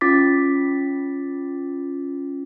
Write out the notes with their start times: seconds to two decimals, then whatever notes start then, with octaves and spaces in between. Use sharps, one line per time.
0.01 C#4 F4 D6 A6 B6